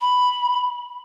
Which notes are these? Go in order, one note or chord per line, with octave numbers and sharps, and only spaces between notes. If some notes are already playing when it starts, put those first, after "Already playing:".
B5